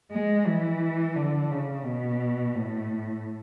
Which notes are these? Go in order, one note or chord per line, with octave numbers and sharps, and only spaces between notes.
G#3
E3
D3
C#3
B2
A2